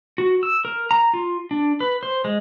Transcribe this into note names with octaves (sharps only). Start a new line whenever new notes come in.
F#4
E6
A#4
A#5
F4
D4
B4
C5
G#3